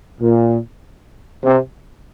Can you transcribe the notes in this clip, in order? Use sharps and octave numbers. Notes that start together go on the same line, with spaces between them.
A#2
C3